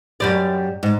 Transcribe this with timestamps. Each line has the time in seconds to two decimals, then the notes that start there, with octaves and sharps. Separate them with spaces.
0.20 F#2 G3 D5
0.83 G#2